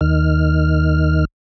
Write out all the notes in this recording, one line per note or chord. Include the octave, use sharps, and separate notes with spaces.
D#2 D#3 F6